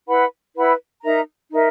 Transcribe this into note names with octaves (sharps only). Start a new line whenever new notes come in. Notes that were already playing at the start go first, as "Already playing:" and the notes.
E4 B4 F#5 B5
E4 B4 F#5 B5
D#4 A#4 E5 A#5
D#4 A#4 E5